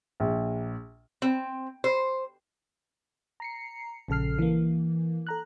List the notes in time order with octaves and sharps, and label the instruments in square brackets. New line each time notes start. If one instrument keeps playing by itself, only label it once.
[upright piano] A#1
[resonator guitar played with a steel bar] C4
C5
[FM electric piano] A#5 C7 C#7
A#1 C#3 A4 F6 C7
E3 A#3
A4 A#5 F#6